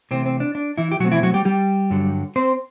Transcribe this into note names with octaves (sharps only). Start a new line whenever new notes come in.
C3 E3 A3 C4
C4
D4
D4
E3 E4
G4
B2 F#3 A3 C4 F#4
E3 E4
F#3 F#4
G3 G4
G3 G4
G2 D3 F#3
C4 C5